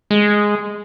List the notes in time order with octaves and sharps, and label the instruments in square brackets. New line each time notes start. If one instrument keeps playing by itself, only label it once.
[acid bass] G#3